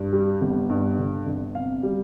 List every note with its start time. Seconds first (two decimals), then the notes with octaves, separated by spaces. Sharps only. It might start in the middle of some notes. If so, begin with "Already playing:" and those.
Already playing: G2
0.13 G3
0.42 G1
0.70 G2
0.98 D3
1.26 G1
1.55 C3 F5
1.83 G3